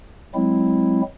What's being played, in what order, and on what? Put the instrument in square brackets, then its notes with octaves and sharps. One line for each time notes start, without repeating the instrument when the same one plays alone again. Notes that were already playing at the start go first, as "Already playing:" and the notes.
[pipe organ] F#3 G#3 C4 E4